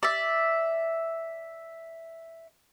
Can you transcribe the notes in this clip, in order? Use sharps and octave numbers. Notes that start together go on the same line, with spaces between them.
D5 E5